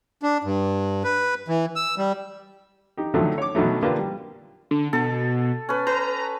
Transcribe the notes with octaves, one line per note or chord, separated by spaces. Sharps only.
D4
G2
B4
E3
E6
G3
D#4 G4
D3 D#3 F3 F#3 A3
C#5 D6
B2 D#3 F#3 A3
D3 A#3 D4 F4 G4 B4
G3
D3
B2 A4
C#4 B4
B4 A#5